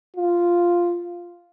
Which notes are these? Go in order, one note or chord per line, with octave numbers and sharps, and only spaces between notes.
F4